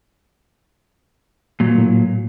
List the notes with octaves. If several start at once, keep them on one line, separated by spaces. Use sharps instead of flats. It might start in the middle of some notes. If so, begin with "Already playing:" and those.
A#2 F#3
A2